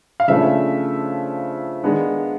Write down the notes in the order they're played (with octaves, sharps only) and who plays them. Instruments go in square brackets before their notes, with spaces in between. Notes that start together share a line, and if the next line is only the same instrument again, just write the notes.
[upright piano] F5
C#3 F3 A3 D4 E5
D#3 G#3 B3 D4